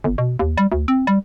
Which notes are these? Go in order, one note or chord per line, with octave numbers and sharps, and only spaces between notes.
G1
B2
D#2
G3
D2
C4
G3